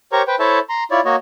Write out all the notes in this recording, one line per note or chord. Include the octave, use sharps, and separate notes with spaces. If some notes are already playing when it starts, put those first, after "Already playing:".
G4 A#4 C5 C#5 A#5 C#6
B4 C5 G5
E4 A4 C5 C#5 E5 A5
A#5 C6
E4 F4 C#5 D5
A#3 F#4 C#5 D#5